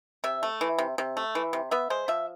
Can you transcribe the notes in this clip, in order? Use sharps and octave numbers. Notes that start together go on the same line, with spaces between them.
C3 E5
A3
E3
C3
C3
A3
E3
C3
B3 E5
G#3 C5
F3 E5